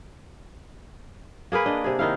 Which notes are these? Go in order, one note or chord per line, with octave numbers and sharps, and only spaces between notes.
A#3 G#4 A#4 B4
D4 D#5
C3 G#4
D#3 D#4 E4 F5